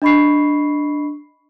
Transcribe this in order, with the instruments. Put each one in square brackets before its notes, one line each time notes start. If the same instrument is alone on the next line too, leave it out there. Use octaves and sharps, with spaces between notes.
[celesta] D4 D#5 B5 C#6 C7